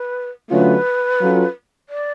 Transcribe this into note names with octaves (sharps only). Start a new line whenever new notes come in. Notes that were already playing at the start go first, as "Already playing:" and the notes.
Already playing: B4
D3 F#3 A3 C#4 F4 B4
F#3 C#4 F4 A4
D5